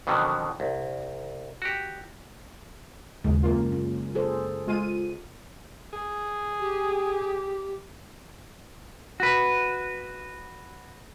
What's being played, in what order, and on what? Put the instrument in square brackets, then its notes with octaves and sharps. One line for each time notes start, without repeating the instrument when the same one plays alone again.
[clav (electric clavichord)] F2 B2 D3 D#3 F#3
C2
F#4 G4
[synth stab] D#2 G#2 [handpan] C#3 G#3
[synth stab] F#2 A#3 F4
[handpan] C#4
G#4 A4 C5
[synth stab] G#3 F4 D#7
[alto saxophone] G#4
[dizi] G4
[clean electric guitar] F#4 B4